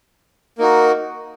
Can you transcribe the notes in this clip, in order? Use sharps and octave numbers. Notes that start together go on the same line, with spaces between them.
A#3 D#4 F#4